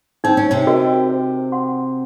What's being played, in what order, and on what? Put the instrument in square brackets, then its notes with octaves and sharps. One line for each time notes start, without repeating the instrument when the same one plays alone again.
[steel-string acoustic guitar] C4 [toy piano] D#4
[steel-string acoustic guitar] C#4
C3 C4
[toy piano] F#4 A#4 D#5
C5
F#5 C6